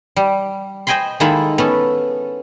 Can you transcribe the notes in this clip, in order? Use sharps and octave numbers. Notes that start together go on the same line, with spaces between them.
G3
C5 D#5 G5 G#5 B5 C6
D#3 G#3 A#3 E4 A4 B5
B3 C#4 A4